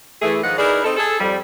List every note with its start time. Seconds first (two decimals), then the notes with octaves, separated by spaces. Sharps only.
0.22 E3 A3 G#4
0.43 G#2 D#3 F3 B4 D#5 F#5
0.59 D#4 E4 G#4 A#4 B4 D5
0.85 C4 D#4 A4
0.97 G#4 A4
1.20 F2 G3